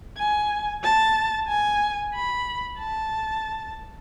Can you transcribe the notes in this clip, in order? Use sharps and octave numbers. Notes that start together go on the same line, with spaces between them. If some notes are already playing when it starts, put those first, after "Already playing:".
G#5
A5
G#5
B5
A5